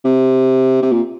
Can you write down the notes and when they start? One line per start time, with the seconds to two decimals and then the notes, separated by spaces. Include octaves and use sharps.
0.05 C3
0.82 C3
0.92 A#2